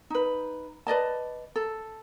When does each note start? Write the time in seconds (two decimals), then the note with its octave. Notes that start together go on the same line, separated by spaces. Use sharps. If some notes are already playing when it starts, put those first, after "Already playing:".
0.10 D#4 B4
0.87 B4 D5 D#5 A5
1.56 A4